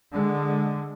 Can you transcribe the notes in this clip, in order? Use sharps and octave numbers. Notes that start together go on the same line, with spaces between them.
D3 G#3